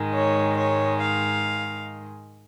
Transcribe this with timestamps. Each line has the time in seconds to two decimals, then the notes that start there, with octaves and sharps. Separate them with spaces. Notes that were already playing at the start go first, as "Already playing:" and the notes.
Already playing: G#2 D#3 G#3
0.14 C#5
0.58 C#5
1.01 F5